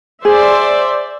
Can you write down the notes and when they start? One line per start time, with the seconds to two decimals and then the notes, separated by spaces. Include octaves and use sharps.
0.25 G#4 C5 D5 E5